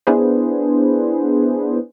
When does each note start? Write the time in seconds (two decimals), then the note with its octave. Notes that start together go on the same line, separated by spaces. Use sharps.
0.07 B3 D4 E4 G#4 B4 C5